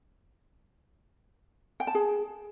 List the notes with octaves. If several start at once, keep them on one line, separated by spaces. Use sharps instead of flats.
G5
A5
G#4